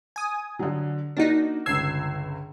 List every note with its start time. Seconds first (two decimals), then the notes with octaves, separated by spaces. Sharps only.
0.16 G#5 D#6
0.59 D3 F#3
1.17 A#3 D4 D#4 F#4
1.66 G1 C#2 E6 G#6 C7